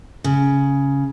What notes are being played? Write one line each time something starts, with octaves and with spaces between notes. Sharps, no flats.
C#3